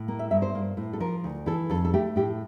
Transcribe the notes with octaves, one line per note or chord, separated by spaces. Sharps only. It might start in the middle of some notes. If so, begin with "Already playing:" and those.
Already playing: A2
A#3
E5
G2 E5
C5
A#3
A2
A4
F3 A#4
D2
E3 A4
F2 A4
A4
A3 G4
A2 G4